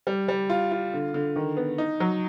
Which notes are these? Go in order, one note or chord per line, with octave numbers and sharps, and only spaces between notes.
G3
G3
F4
F4
D3
D3
D#3
B3
D#4
F#3